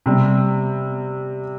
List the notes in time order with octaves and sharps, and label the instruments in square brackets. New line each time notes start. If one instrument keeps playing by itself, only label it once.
[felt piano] C3 G3 C4